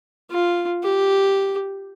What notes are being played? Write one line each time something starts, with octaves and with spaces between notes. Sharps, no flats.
F4
G4